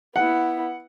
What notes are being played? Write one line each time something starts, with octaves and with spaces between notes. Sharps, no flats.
B3 E4 F#5